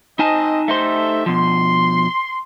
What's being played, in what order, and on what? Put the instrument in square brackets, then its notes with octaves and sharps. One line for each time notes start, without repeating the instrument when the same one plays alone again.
[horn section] C4 D#5 [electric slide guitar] D#4 G#5 A5
[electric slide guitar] A3 D#4 C5 [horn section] G4 A4 E5
[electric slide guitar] B2 F3 [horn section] C6